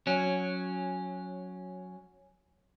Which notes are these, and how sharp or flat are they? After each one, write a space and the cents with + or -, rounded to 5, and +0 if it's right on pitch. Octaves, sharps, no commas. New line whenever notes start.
F#3 -15 C#4 +0